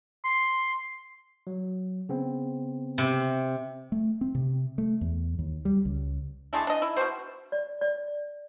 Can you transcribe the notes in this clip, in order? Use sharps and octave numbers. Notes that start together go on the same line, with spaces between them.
C6
F#3
C#3 B3 C4
C3
A3
C4
C3
A3
E2
D#2
G3
C#2
G#3 A3 D4 E4
D4 D#5
E4
B2 C4 F#4 C5
D5
D5